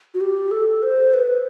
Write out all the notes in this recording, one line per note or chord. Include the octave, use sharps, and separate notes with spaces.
F#4
G4
A4
C5
B4